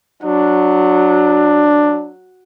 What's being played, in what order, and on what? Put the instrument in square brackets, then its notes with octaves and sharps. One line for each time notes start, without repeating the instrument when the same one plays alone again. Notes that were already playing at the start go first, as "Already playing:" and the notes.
[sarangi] F#3 [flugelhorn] D4